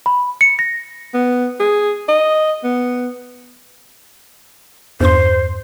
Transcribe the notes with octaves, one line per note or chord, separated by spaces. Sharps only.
B5
C#7
A#6
B3
G#4
D#5
B3
E2 G2 C5 C6